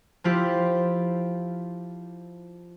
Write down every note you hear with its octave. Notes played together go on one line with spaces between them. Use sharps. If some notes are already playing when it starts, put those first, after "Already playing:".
F3 E4 F4 G4